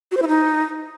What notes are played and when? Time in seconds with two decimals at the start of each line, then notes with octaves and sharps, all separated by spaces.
0.11 F#4
0.17 C5
0.22 E4
0.28 D#4